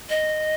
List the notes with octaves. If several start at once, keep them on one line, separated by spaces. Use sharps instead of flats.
D#5